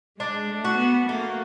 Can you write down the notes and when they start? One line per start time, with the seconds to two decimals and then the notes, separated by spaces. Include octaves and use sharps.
0.20 G#3 D4
0.50 A3
0.65 F#4
0.79 B3
1.08 A3 A#3